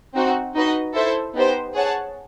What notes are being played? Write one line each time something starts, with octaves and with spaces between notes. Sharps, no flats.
C4 D#4 F#4
D#4 F#4 B4 D#5
E4 A4 C5 E5
B3 D#4 G4 C5
G#4 C#5 F#5 A5